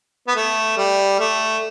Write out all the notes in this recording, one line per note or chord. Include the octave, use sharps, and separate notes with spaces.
B3
A3
G3
A3